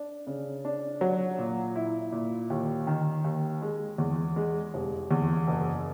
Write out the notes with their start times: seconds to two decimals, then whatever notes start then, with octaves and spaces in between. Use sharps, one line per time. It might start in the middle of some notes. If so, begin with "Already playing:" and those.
Already playing: D4
0.27 C#3
0.65 D4
1.01 F#3
1.38 A#2
1.76 E4
2.12 A#2
2.50 D#2
2.87 D#3
3.24 D#2
3.62 G#3
3.98 E2
4.36 G#3
4.74 F1
5.11 E2
5.47 F#1